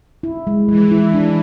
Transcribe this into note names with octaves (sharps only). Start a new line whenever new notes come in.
E4
G#3
E3 G#3
E4
D4